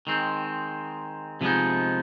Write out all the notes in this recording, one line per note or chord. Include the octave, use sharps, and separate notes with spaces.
D#3 G#3 C4
C3 F3 G#3 B3 D#4